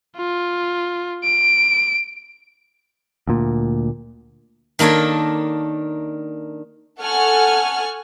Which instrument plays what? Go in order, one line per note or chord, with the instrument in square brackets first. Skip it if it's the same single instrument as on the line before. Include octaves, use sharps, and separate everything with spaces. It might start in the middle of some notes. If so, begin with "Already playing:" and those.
[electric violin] F4
D7
[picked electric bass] D2 A#2
[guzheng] D#3 A#3 D4 A4 C#5
[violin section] A4 F#5 G#5 C#6 F6